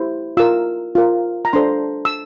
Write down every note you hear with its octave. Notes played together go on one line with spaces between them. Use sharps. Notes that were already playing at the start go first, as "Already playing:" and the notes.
Already playing: E4 G4 C5
F4 A#4 E6
F4 A#4
A#5
D4 A4 C5 C6
E6